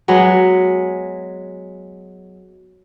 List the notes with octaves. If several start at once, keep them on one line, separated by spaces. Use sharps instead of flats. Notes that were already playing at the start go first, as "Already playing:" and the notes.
F#3 G#3 B3